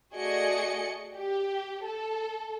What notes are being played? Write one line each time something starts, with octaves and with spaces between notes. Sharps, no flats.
A3 F#4 G#4 D5 D#5 C#7
G4
A4